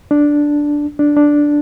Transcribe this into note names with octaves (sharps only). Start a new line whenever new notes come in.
D4
D4
D4